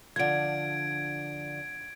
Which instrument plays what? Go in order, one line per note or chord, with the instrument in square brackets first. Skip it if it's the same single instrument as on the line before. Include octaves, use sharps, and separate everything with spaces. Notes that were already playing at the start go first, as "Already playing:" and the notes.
[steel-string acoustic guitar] D3 F3 [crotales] G#6 D7